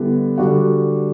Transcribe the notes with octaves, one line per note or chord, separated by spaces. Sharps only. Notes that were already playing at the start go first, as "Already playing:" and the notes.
Already playing: D3 G3 B3 E4
D3 G3 D4 F#4